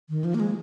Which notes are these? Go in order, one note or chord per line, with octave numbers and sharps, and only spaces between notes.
D#3
F3
A#3
G#3